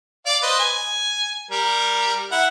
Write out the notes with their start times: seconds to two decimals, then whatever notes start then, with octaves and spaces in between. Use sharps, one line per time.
0.26 D5 F5 D6
0.43 B4 C5 D#5
0.59 G#5
1.51 G3 A#4
2.32 E4 F#5